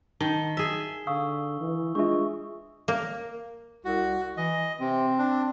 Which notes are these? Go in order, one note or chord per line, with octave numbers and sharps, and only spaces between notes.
D#3 A5 G7
G#4 E5
D3 F5 C#6 D#6 E6
E3
G#3 D4 F4 E5 C#6
A#3
C2 F#4
E3 D#5
C3 C4
D4